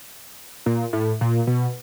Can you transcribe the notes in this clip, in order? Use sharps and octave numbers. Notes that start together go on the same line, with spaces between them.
A#2
A2
A#2
B2